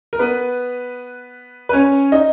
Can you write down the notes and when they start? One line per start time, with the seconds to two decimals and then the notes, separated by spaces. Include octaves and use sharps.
0.13 A#4
0.19 B3 B4
1.69 B4
1.73 C#4 C#5
2.12 D#4 D#5